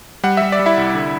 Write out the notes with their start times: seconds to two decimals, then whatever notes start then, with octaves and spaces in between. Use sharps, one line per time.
0.23 G3 F#5
0.37 G3 E5
0.52 D5
0.59 G3
0.66 E4 E5
0.77 C2
0.95 D3